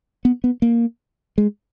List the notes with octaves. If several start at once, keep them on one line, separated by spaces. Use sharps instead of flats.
B3
B3
A#3
G#3